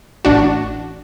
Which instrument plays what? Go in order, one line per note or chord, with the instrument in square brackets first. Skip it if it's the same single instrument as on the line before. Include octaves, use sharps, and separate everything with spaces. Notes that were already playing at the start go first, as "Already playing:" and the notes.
[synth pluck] A1 D4 F#4